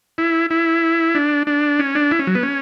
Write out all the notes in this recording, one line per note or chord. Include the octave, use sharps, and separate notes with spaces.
E4
E4
D4
D4
C#4
D4
E4
C#4
F#3
B3
C#4